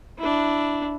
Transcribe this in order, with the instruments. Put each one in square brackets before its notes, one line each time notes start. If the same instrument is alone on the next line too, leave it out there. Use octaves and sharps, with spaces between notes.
[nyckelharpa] D4 E4